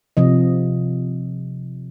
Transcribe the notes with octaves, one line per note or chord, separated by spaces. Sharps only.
C3 F3 D#5